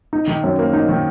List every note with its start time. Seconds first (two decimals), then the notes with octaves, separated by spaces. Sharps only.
0.13 D#4
0.27 D#3
0.44 F#2
0.59 A#3
0.73 D#4
0.89 D#3